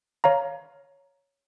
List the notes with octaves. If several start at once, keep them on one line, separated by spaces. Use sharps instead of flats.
C#5 F5 A#5